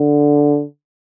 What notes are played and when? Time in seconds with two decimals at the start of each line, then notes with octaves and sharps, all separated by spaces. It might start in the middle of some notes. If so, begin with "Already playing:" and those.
Already playing: D3